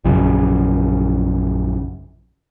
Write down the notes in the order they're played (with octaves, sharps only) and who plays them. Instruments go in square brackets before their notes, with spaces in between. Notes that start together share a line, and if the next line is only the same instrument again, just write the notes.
[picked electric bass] A#1 F#2 C#3